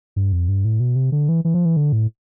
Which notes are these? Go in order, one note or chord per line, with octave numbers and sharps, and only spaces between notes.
G2
F2
G2
A2
B2
C3
D3
E3
E3
F3
E3
D3
A2